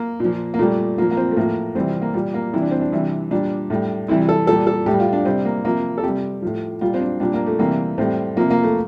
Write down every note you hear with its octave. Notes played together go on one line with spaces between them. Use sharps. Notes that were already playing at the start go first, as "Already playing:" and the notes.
Already playing: A#3
A#2 F3
A#3
A#2 G3 A3
A#2 F3 A#3
A#3
C4
A3
A2 F3 A#3
C3 E3 G3 C4
A#3
A#2 G3
A#3
C3 E3 G3 E4
D4
C4
D4
C3 E3 G3
A#2 G3 D4
A2 G3
C3 E3 G3 E4
A4
A#2 G3 A4
A4
A2 G4
G3
F4
D4
C3 G3 C4
A#3
C3 F3 A#3
A4
C3 G3 G4
A2 F3
A#2 G3 F4
C4
D4
A#2 G3 D4
A#3
A3
C3 E3 G3 A#3
A2 G3 C4
C3 F3 A#3
A#3
A3